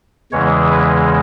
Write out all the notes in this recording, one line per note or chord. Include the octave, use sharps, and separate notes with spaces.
E2 C#3 E3 G#3 C#5
B4